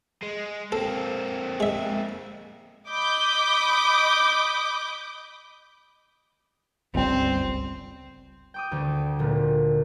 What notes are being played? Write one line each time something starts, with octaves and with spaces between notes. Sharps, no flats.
G#3
A#3 C4 A4
G#3 E5
D#5 B5 D6 D#6 G6
G1 C#2 G3 C4
G5 D6 D#6
D2 D3
F1 A#2